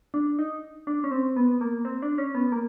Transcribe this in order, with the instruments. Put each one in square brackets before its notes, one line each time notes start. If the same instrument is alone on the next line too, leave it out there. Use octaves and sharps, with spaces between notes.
[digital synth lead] D4
D#4
D4
C#4
C4
B3
A#3
C4
D4
C#4
B3
A#3